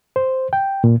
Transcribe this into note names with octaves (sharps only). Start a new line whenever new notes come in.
C5
G5
A#2